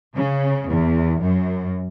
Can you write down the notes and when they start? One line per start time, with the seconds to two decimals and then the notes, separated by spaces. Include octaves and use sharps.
0.15 C#3
0.68 E2
1.22 F#2